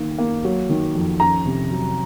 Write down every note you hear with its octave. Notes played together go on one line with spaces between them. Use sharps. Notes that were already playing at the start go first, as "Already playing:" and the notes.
Already playing: D#3 A#3 D#4
A#3
F#3
D#3
F2
C#4 A#5
C3
F#3